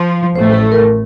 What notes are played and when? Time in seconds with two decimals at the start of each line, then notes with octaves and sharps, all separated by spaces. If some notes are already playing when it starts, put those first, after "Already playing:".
Already playing: F3
0.36 A1 A2 A3 C5
0.53 A4
0.72 A#4